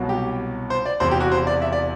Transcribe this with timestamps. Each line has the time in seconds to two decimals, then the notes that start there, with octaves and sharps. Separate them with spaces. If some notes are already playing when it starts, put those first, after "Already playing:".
Already playing: C2 B2 F#3
0.09 G4
0.70 C5
0.86 D5
1.00 E1 E2 C3 C5
1.11 G4
1.21 F#4
1.32 C5
1.47 D5
1.62 E5
1.72 D5